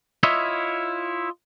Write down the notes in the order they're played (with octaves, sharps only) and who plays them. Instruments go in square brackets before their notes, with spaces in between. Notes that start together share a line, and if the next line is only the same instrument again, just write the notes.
[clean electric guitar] E4 F4 C#5 D#5 E5